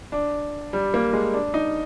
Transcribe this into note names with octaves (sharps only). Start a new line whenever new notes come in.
D4
G3
A#3
G#3
D4
D#4